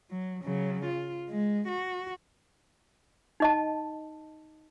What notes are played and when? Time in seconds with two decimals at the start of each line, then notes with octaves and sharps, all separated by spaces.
0.11 F#3
0.43 C#3 F#3
0.85 F4
1.29 G#3
1.68 F#4
3.40 D#4 D#5 A5